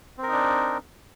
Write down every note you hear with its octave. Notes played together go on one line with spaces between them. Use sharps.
C4 D4 D#4 A#4